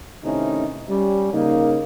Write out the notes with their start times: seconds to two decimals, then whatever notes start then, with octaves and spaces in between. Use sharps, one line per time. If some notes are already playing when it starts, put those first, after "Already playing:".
0.23 C3 D#3 A3 C#4 D#4 E4
0.90 G3 C#4
1.33 C#3 A#3 D#4